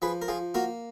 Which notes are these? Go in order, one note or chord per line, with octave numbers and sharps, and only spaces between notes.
F3 G#4 B4
A#4
F3 F4 G#4
A#3 F#4 A#4